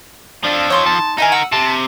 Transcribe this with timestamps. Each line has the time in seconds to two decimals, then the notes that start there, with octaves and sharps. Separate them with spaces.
0.44 F3 D4 A4
0.70 D#4 C#5 C6 C#6
0.86 A5
1.18 D#4 E4 A#4 D#5 G#5
1.32 F#5 E6
1.52 C3 A5